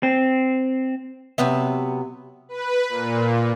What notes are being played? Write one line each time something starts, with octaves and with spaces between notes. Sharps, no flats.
C4
C3 F#3 B3 E5
B4
A#2